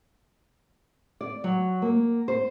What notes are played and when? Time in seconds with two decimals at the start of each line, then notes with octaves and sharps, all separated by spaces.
1.21 D5
1.44 F#3
1.82 A#3
2.28 C5